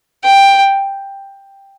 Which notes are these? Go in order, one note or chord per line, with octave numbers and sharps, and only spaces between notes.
G5